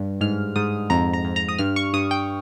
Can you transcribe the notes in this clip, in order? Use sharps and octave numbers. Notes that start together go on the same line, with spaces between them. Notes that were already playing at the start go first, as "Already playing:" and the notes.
Already playing: G2
G#2 F6
G#2 D#6
F2 A#5
A#5
F2
A#5
D#6
G2 F6
C#6
G2 D#6
G5